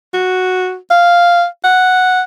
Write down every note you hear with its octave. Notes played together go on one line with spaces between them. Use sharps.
F#4
F5
F#5